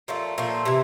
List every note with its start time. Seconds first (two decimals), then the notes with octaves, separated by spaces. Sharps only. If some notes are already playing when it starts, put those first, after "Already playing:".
0.08 A#2 F3 A3
0.38 A#2 F3 A3
0.65 C3 E3